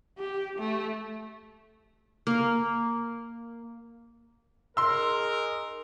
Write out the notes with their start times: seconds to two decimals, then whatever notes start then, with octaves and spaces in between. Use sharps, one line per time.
0.19 G4
0.58 A3
2.27 A#3
4.77 D#4 G#4 A#4 C6 E6